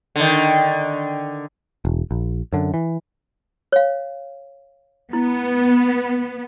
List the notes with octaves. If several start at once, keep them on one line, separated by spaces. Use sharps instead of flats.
D3 D#3
E1
A#1
F#2 D3
E3
C#5 F5
B3 E4